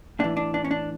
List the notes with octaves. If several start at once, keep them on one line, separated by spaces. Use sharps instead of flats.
A2 E3 D4
D4
D4
C#4
D4